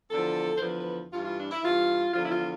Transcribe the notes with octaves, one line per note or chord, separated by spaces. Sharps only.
E2 D3 F3 A4
C5
E2 D3 F3 B4
B4
G2 E3 F4
F4
D4
E4
G2 E3 F4
E2 D3 F3 F4
E4
F4